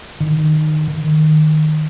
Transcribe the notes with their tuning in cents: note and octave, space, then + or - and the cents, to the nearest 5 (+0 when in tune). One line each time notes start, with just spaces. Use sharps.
D#3 -20
D#3 -10